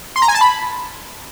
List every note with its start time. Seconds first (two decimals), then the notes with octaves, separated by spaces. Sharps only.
0.16 C6
0.22 A#5
0.28 G#5
0.35 A5
0.41 B5